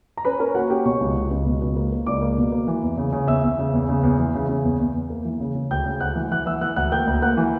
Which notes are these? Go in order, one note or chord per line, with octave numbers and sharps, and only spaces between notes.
A#5
C#4 B4 B5
C#4 A#4 A#5
A#3 F#4 F#5
C#4 G4 G5
B2 C#5 C#6
C#2
C#2
C#2
B2
C#2
A#3
A#3
C#2 D5 D6
A#3
B2
A#3
E3
E2
C#3
C#3
E2 E5 E6
E2
C#3
E2
C#3
E2
E3
C#3
C#3
E2
E2
E2
A#3
E3
C#3
C#3
D2 G5 G6
C#3
D2 F#5 F#6
E3
E3 F#5 F#6
E3 E5 E6
E3 F#5 F#6
D2 F#5 F#6
A#3 G5 G6
D2
A#3 F#5 F#6
E3